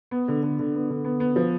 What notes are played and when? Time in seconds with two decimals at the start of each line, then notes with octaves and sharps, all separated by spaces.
0.11 B3
0.28 D3
0.42 D3
0.59 D3
0.75 B3
0.90 D3
1.05 B3
1.20 B3
1.36 F3